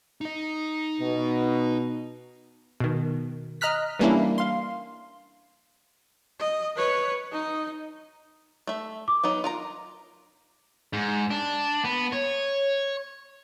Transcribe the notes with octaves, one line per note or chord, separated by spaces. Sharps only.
D#4 D#5
B2
B2 D#3
D#5 A#5 F6 F#6 B6
E3 G3 A#3 C#4 D4 E4
F5 C6
D#5
B4 C#5
D#4 D#5
A3 E5
D6
F#3 B3 D#4
F4 A#4 A#5
G#2
D4
B3
C#5